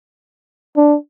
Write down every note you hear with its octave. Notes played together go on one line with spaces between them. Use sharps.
D4